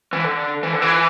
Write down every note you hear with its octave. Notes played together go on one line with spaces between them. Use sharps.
E3
D3
E3
D3
E3